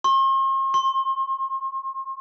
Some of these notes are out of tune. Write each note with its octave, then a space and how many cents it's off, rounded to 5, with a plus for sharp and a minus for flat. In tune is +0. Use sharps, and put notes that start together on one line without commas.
C6 +45
C6 +30